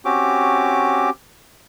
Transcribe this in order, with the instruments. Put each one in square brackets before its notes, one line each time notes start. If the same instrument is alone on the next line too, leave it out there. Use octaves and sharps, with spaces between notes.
[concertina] C4 C#4 F#4 G4 D6